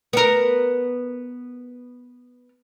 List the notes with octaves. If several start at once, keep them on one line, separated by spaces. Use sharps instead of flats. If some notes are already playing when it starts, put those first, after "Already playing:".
B3 A#4